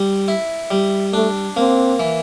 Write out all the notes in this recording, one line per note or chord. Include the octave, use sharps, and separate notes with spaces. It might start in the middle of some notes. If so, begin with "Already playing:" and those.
Already playing: G3
E4
G3
A3 D4
A#3 C4
E3